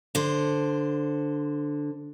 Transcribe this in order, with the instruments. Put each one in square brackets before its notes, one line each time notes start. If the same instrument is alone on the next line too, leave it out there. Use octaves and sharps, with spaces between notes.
[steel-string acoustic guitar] D3 C5